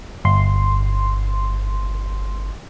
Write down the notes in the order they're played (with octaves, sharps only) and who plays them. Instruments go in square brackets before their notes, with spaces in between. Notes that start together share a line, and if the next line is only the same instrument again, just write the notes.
[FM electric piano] G1 C6